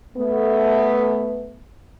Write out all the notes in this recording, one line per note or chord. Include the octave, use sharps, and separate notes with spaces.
A3 B3